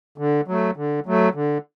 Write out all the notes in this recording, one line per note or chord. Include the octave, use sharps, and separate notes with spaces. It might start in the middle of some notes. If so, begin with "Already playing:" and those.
D3
F#3 A3
D3
F#3 A3
D3